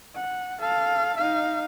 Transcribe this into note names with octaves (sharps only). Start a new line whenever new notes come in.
F#5
A4 F5
D#4 F5